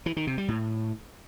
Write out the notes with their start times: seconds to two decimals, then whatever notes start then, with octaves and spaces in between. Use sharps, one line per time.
0.06 E3
0.17 D#3
0.27 C3
0.38 G3
0.48 A2